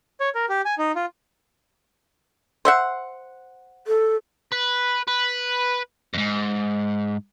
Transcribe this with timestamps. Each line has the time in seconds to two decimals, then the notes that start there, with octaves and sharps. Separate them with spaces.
0.20 C#5
0.35 A#4
0.49 G4
0.65 G#5
0.78 D#4
0.96 F4
2.65 C5 E5 F#5
3.87 A4
4.52 B4
5.08 B4
6.14 F2 G#2